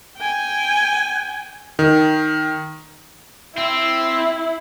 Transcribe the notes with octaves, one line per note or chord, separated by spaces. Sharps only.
G5 G#5
D#3
C4 E4 E5